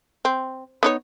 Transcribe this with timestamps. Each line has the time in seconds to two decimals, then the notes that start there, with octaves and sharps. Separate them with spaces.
0.25 C4
0.83 B3 D#4 C#5